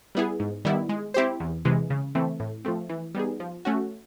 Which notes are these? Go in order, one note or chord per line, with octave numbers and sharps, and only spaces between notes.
G3 B3 E4 G#4
G#2
D#3 G3 B3 E4
G#3
C4 E4 G4 C5
E2
C3 E3 G#3
C#3
E3 A3 C4
A2
F3 A3 C4
E3
G3 B3 D#4 G#4
F3
A3 C#4 F#4